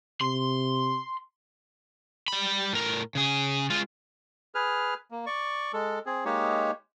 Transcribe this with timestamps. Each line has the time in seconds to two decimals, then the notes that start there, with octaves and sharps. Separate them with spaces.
0.21 C3 C6
2.28 G3 B5
2.73 A2 A#4
3.15 C#3 G#4
3.70 G#3 F4
4.55 G#4 B4 F6
5.11 A#3
5.26 D5 C#6
5.73 G#3 A4
6.06 C4 G#4
6.25 G#3 A#3 D#4 G4 C#5